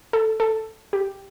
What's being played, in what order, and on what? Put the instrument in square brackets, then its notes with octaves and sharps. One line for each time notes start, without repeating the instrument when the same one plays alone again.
[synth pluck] A4
A4
G4